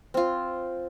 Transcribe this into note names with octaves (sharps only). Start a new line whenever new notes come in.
C4 F4